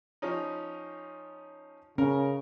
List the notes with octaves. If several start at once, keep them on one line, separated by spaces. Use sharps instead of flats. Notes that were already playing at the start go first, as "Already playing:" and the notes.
F3 C#4 D#4
C#3 C#4 A#4